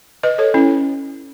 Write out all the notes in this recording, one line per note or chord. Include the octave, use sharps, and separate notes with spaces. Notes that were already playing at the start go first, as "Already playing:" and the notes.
B4 D#5
A4 C#5
C#4 E4